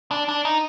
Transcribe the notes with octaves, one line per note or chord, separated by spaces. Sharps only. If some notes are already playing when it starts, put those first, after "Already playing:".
D4
D4
D#4